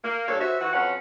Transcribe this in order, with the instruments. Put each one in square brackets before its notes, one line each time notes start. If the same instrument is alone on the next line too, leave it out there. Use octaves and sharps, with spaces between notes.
[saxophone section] A#3
G2 A#2 A4 C#5
F#4 C5 E5
E3 F#4
F2 F#3 C#4 B4 F#5